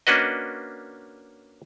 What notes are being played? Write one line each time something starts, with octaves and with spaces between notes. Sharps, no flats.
A#3 C#4 D4 F#4 B4 D#5